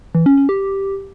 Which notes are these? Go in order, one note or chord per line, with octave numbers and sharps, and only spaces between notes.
E3
C#4
C#4
G4